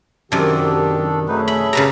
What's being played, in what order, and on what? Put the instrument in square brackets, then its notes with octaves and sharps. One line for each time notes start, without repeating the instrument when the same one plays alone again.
[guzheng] F#2 C3 [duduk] D#3 [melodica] D4 A4 [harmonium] G4
[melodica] F#3 D#4 B4 [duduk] A3 [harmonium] C#4 G#4 A4
[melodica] E5 [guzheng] B5
[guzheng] C#3 B4 A#5 [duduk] G4